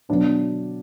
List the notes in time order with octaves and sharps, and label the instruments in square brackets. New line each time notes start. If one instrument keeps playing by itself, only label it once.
[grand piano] B2 F#3 B3 D4